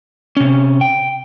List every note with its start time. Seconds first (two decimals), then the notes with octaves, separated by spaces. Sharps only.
0.37 C3 C#4
0.81 G5